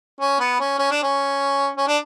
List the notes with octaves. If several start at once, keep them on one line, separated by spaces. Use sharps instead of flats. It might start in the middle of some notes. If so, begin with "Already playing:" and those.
C#4
B3
C#4
C#4
D4
C#4
C#4
D4